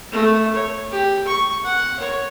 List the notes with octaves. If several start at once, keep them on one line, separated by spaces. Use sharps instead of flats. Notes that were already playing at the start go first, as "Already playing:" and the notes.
A3
C#5
G4
C#6
F#5
C#5